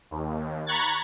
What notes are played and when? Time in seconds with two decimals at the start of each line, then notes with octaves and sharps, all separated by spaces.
0.11 D#2
0.66 A#5 B5 C#6 F#6 G#6 A6